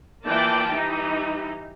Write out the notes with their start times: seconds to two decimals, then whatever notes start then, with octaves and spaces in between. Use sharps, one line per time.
0.25 E3 A#3 F4 D5 G5 A5
0.71 E3 G3 D#4 G4